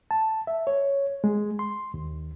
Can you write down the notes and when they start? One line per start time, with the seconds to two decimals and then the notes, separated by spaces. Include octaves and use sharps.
0.11 A5
0.47 E5
0.67 C#5
1.24 G#3
1.59 C6
1.94 D#2